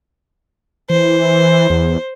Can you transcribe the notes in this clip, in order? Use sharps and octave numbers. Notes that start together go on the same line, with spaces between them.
E3 C5
E2